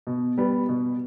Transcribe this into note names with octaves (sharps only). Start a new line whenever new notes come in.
B2
G3 B3
B2